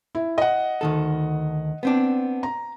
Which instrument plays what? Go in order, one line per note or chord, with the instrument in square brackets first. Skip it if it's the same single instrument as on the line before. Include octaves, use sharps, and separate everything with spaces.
[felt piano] E4
D#5 F#5
[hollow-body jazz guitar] D2 D#3 A4
B3 C4 D4
[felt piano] A#5